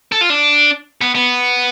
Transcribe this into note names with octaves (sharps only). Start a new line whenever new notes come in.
A4
F4
D4
B3
B3